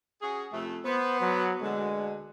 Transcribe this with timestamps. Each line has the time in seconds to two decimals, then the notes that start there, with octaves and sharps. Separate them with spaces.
0.22 C#4 F#4 G#4
0.52 F2 C3 A3
0.85 B3 C5
1.21 F#3
1.62 D2 B2 D3 G#3